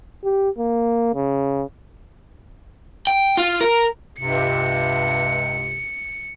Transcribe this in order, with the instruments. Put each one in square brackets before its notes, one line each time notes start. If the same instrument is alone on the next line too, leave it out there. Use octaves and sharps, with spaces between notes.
[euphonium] G4
A#3
C#3
[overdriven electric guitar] G5
F4
A#4
[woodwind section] C#2 G2 C3 [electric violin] C#7